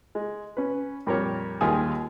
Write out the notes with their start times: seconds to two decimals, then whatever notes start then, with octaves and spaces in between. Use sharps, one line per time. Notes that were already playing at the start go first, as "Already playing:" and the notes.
0.15 G#3
0.57 C#4 B4
1.06 F2 A#2 G3 A#3 G4 C#5
1.61 D#2 G3 G#3 F4 G#5 D#6